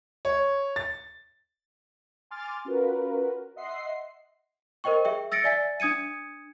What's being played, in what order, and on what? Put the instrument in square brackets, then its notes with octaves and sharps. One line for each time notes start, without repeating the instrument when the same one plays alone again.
[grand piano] C#5
A6
[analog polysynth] G#5 C6 D6 F6 A6
C#4 F4 F#4 A#4 B4
D#5 E5 F#5 C6 C7
[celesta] A#4 C5 D#5 G5 C#6
G#4 E5 G5
E6 A6 A#6 C#7 D7
D5 E5 G#5 A6 B6
D4 D#6 G#6 C#7 D#7